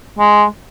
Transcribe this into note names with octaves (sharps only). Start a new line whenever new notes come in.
G#3